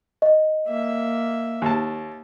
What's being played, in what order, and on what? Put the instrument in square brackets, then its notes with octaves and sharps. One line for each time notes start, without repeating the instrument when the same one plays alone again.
[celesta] D#5
[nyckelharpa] A#3 E5
[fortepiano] D#2 A5